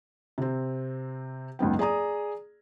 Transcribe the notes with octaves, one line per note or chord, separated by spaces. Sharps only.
C3 C4
F#1 C#2 G#2 B3 G5
G#4 D5 A#5 D#6